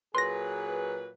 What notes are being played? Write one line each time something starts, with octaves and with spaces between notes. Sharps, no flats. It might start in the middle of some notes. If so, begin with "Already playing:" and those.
A#2 F#3 G#4 B4 C6 A#6